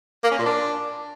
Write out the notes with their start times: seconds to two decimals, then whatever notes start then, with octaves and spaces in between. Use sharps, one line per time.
0.24 A#3
0.31 C#4
0.38 A#2
0.46 D4